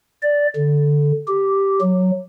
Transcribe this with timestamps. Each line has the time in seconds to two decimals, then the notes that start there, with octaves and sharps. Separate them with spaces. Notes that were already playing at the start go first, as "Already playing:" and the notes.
0.22 D5
0.56 D3
1.28 G4
1.81 F#3